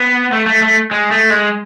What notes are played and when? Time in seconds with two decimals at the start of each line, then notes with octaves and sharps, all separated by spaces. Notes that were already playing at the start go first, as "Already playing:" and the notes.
Already playing: B3
0.33 A3
0.47 A3
0.62 A3
0.91 G#3
1.11 A3
1.30 G#3